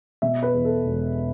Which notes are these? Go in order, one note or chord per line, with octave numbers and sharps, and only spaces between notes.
B2 E5
B4
E2
A4
E1